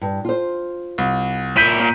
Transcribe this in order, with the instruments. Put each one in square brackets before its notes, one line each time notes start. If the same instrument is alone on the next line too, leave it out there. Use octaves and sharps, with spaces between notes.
[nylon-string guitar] G2
F4 C5
[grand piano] C2
[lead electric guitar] A#2 E4 [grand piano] G6 B6 D#7
[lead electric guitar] A#2